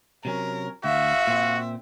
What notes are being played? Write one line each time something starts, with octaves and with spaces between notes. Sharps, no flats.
C3 F#3 C#4 A#4
D2 F#4 E5 F5
A#2 C4